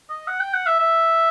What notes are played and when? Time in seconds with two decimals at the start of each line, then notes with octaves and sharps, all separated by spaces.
0.10 D#5
0.27 F#5
0.40 G5
0.53 F#5
0.66 E5
0.79 E5